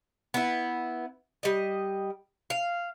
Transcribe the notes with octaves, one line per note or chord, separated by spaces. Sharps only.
B3 E4
G3 D#5
F5